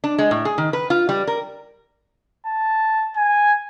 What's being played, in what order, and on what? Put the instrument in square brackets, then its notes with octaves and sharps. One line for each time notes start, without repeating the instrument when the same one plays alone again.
[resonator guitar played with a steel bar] D4
G#3
A2
G#4
D#3
B4
F4
G3
A#4
[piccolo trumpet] A5
G#5